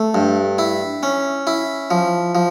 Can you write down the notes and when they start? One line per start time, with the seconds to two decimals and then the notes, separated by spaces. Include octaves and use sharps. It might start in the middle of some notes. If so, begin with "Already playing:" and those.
Already playing: A3
0.14 G2
0.58 E4
1.03 C#4
1.47 E4
1.91 F3
2.35 F3